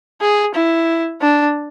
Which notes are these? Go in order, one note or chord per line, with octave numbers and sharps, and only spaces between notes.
G#4
E4
D4